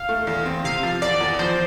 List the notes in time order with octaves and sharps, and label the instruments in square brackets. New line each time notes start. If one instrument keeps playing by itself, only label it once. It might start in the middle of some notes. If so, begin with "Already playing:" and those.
Already playing: [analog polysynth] F5
[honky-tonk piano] A3
E2
C4
[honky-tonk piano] C3 [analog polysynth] F5
[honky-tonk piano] F3
[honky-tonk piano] E2 [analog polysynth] D5
[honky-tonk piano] E2
[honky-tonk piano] F3 [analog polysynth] C5